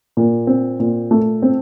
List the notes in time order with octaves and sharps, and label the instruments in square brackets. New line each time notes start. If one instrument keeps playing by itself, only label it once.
[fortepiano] A#2
C4
A#2
A3
C4